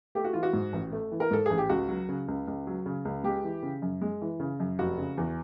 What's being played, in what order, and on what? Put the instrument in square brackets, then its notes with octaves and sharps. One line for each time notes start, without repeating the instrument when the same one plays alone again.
[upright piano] A3 G4
F#4
E3 F4
F#4
G#2
A1
A3
E3
A#4
G#2 A4
A1 G#4
G4
C#2 F#4
F#3
C#3
C#2
C#2
F#3
C#3
C#2
G#3 G4
E3
C#3
F#2
G#3
E3
C#3
F#2
F1 F#4
C#3
E2